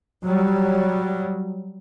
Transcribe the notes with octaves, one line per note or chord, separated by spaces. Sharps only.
F#3 G3